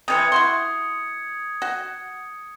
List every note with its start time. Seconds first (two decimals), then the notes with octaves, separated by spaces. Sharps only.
0.08 C3 E3 C4 D#6 G#6 C#7
0.32 E4 F#4 C6
1.62 F#4